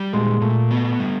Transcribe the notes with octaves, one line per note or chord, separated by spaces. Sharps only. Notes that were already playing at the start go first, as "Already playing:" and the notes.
Already playing: G3
A#2 G#3
A#2 A3
B3
G3